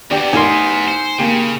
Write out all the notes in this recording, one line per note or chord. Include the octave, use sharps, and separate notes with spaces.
E2 B3 D4 G4 D5
A1 D#4 A#4 G#5 C6
C5 C#7
C#3 A#3 G4